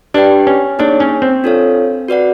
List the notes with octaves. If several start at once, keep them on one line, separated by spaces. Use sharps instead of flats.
D4 G4 B4 D5 G5
C#4
A#3 D4 D#4 G#4 C#5
C#4
C4
D4 F4 A4 C#5 F5
F#4 B4 D5 F#5